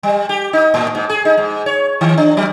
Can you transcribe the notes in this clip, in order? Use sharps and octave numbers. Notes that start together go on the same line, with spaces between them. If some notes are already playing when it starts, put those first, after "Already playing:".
G3
G4
D#4
A2
G#2
G#4
D#4
G#2
C#5
D#3
D4
F#3